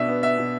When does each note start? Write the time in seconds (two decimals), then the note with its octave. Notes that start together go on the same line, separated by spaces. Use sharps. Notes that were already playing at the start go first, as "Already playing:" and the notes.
Already playing: B2 D4 E5
0.08 B3
0.23 B3 E5
0.38 B2